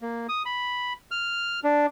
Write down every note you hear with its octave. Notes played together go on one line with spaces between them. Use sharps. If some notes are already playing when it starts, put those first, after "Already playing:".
A#3
D#6
B5
F6
D4